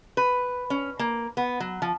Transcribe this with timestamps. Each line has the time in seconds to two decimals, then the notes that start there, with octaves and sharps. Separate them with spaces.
0.17 B4
0.70 C#4
0.99 A#3
1.37 B3
1.60 F#3
1.82 F3